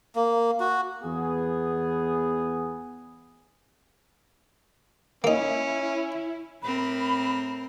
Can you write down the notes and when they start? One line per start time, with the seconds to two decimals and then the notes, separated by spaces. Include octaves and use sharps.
0.15 A#3
0.60 F#4
1.04 E2 B3 G#4
5.24 A#3 C#4 D#4 E4
6.63 A2 C4 A#4 B5